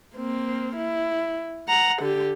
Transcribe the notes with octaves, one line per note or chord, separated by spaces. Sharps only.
A#3 C4
E4
F#5 A#5
D3 G4